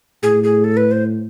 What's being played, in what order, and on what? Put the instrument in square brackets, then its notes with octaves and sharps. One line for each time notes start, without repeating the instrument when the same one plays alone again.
[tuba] A2 [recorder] G#4
[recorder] G#4
A4
B4
C5